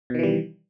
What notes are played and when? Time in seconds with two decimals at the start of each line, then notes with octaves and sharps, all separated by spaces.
0.10 B2
0.14 D#3
0.19 E3
0.23 G3